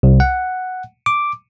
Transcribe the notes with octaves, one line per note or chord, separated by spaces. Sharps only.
C2
F#5
D6